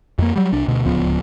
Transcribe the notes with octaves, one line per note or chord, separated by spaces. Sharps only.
F2 A#3
F#3 G3
C2 D4
D2 B2
D1 C#2 F3 B3